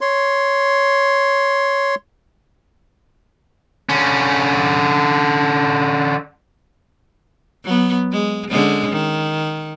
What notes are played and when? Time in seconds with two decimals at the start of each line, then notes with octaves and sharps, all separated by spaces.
0.01 C#5 C6
3.89 D3 C#4
7.65 F#3 B3
8.12 G#3
8.49 D3 G#3 C#4
8.92 D#3